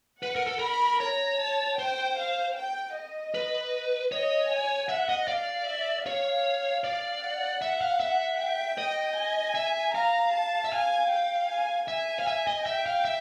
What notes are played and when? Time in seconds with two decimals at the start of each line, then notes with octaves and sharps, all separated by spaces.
0.23 B4 F#5
0.36 A#4
0.47 A4
0.59 A#4 B5
1.00 C#5 A#5
1.40 A5
1.78 C5 G5
2.18 F5
2.56 G5
2.95 D#5
3.34 B4
4.12 C#5 D#5
4.51 G#5
4.89 E5 F#5
5.09 D#5
5.28 D5 F5
5.67 E5
6.06 C#5 F5
6.84 D5
7.22 F#5
7.62 E5
7.81 F5
8.00 E5
8.39 G5
8.78 D#5
9.16 G#5
9.55 E5
9.95 F5 A#5
10.33 A5
10.65 E5
10.72 F5 G#5
11.10 G5
11.50 G#5
11.88 E5 G#5
12.19 F5
12.27 E5
12.47 D#5
12.66 E5 G5
12.86 F5
13.05 E5